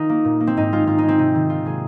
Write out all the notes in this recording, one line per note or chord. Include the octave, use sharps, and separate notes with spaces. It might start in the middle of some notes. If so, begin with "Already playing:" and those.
Already playing: D#3 C4 D#4 F4
A#3
A#2
A#3
C4
G#2 D#4
G#3 F4
G#2 F4
G#3 D#4
C4
C3 D#4
D#3 G#3
C3 F4
D#3 G#3 G#4